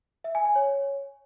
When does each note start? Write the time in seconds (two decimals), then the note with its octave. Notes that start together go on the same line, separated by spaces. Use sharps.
0.24 E5
0.35 G#5
0.45 G#5
0.56 C#5